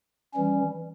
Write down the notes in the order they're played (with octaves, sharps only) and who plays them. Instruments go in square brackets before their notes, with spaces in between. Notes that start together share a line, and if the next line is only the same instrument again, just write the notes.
[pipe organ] E3 G3 C#4